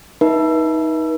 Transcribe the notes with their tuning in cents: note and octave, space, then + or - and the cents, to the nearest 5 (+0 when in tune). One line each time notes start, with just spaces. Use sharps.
D#4 +20 B4 -40 E5 +0